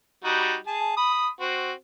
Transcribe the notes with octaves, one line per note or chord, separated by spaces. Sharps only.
G3 D#4 F#4
G#4 A5
B5 D#6
C4 F#4